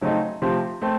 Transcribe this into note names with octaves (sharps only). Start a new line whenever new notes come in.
C#3 F#3 A3 C4 D#4
C3 F3 A3 C4
A3 C4